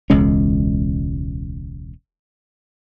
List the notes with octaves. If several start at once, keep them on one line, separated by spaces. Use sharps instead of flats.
E1 C#2 G#3 C#4